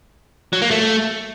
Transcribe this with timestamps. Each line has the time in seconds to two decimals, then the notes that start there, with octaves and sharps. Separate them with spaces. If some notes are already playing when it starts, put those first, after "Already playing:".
0.53 F#3
0.62 A#3
0.71 A3